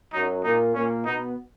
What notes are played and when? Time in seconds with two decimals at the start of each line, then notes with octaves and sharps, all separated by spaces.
0.13 F#2 F#3 D#4
0.44 A#2 A#3 D#4
0.75 A#2 A#3 C#4
1.04 B2 B3 D#4